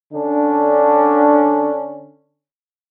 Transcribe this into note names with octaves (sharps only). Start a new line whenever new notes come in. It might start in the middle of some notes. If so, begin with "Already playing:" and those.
D3 C#4 D4